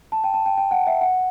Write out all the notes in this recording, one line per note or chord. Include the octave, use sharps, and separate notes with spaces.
A5
G5
A5
G5
G5
F#5
E5
F#5